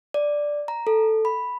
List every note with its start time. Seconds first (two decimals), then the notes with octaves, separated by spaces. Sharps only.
0.14 D5
0.68 A#5
0.87 A4
1.25 B5